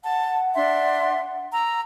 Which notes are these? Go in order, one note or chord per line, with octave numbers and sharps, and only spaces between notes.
F#5 A5
D4 E5 C6
A#5 E6